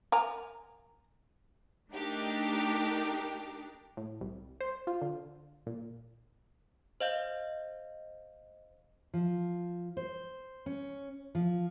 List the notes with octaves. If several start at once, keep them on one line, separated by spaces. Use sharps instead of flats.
A#4 G#5 A#5
A3 D4 D#4 G4 A#4
A2
C2
C5
F4
D3
A#2
C5 D#5 F5 G6
F3
C5
C#4
F3